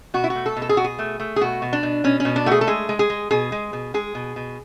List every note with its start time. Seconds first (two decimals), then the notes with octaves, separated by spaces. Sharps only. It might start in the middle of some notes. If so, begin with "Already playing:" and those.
0.14 B2 F#4
0.24 E4
0.30 F#4
0.35 A3
0.46 A4
0.57 B2
0.62 A4
0.69 G#4
0.77 B2 F#4
0.84 G#4
0.99 A3
1.20 A3
1.36 G#4
1.41 B2 F#4
1.62 B2
1.73 D4
1.83 B2
2.04 B2 C#4
2.20 C#4
2.25 B2
2.36 D4
2.46 A3 F#4
2.51 G#4
2.61 A4
2.67 G#3 G#4
2.89 G#3
2.99 G#4
3.10 G#3
3.31 B2 G#4
3.52 G#3
3.73 B2
3.94 G#3 G#4
4.15 B2
4.36 B2